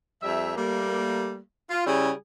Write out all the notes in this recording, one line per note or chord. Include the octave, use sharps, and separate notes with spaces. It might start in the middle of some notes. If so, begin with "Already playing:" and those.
F2 G3 E5
G3 A3 A#3
F4
C#3 G3 E4 G#4